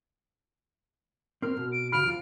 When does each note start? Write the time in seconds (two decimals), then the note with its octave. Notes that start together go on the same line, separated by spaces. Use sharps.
1.42 C4 A#4 F6
1.57 B2
1.72 D7
1.92 C#3 F#4 B5 F6 D7
2.04 E2 F3 F4